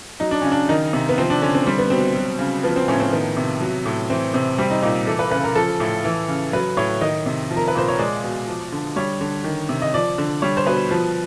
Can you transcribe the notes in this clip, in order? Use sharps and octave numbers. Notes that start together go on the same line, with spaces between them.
F#3 D#4
D4
C#3 C#4
D4
D#3 D#4
C3
B3
F3 C4
D4
D3 C#4
C4
G3 C4
B3
B2 C4
F#3
C#3
F3 B3
C4
A2 C#4
C4
D#3 B3
C3
F#3
A2
E3 C4
C3 C4
G3 C4
D#4
A#2 D#4
E3 A4
B4
C#3 B4
A#4
F3 A4
A2
E3
C#3
F#3 B4
A2 C#5
D#3 D#5
C3
F3
A#4
B4
A#2 C5
C#5
G#3 D5
B2
F3
D3
G3 C#5
D3
D#3
C3
D#5
F3 D5
D3
G3 C#5
C5
B2 B4
F3